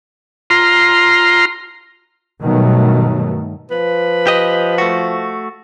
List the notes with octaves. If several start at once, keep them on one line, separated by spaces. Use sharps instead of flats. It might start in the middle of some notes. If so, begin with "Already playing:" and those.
F4 A#5 C6
G2 B2 D#3 F#3 A3
F3 B4
G4 D#5
A3 F#4